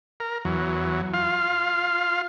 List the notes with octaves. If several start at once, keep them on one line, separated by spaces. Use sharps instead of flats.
A#4
E2 F#3
F4 F5